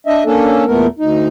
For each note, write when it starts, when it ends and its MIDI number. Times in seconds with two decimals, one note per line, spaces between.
0.07 0.24 62
0.07 0.24 75
0.07 0.24 76
0.25 0.65 58
0.25 0.65 61
0.25 0.65 62
0.25 0.65 69
0.67 0.87 40
0.67 0.87 46
0.67 0.87 57
0.67 0.87 59
0.67 0.87 70
0.99 1.28 38
0.99 1.28 63